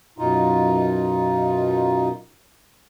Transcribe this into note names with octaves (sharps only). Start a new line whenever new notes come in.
F#2 B2 D#4 F4